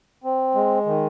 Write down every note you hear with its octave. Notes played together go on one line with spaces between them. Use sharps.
C4
G#3
D#3